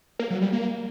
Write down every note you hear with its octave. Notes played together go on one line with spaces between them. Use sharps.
A#3
F#3
G3
A#3